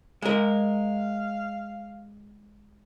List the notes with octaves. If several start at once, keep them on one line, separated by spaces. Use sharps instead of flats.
G#3 A#4 F5